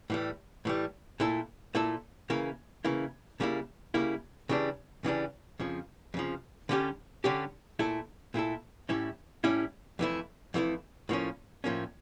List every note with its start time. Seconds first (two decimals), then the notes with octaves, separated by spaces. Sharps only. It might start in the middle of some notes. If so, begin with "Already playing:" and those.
0.10 A2 E3 G3
0.65 A2 E3 G3
1.20 A#2 A3 E4 A4
1.75 A#2 A3 E4 A4
2.30 C#3 E3 A#3 E4
2.85 C#3 E3 A#3 E4
3.40 C#3 G3 A#3 E4
3.94 C#3 G3 A#3 E4
4.49 C#3 E3 G3 D4
5.04 C#3 E3 G3 D4
5.60 F2 C#3 F3
6.14 F2 C#3 F3
6.69 D3 G3 C#4 G4
7.24 D3 G3 C#4 G4
7.79 A#2 A3 E4 A4
8.34 A#2 A3 E4 A4
8.89 A2 G3 C#4 E4
9.44 A2 G3 C#4 E4
9.99 F2 E3 A3 E4
10.54 F2 E3 A3 E4
11.09 A2 F3 A#3 C#4
11.64 A2 F3 A#3 C#4